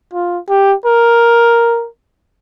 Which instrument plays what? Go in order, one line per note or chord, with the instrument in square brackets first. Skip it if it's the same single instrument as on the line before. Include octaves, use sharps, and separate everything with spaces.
[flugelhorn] F4
G4
A#4